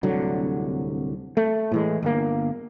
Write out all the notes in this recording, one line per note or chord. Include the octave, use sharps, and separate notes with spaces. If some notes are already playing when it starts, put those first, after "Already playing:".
D1 C2 D3 F#3
A3
A2 E3 G#3
G1 A#3